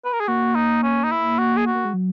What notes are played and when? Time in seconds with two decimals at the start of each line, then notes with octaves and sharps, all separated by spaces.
0.05 B4
0.12 A#4
0.20 G#4
0.28 A#3 F#4
0.55 D#4
0.83 C#4
1.04 D#4
1.11 E4
1.38 F#4
1.56 G#4
1.66 F#4
1.75 A#3
1.85 G#3
1.94 F#3